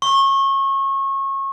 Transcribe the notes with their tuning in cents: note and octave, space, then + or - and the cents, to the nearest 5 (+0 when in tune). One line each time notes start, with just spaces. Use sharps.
C#6 -30